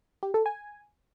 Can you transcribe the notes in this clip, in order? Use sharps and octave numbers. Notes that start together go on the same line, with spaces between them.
G4
A4
G#5